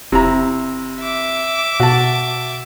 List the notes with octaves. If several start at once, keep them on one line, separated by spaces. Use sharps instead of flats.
E1 C3 E4 A#5
E5 D6
B2 F#4 A5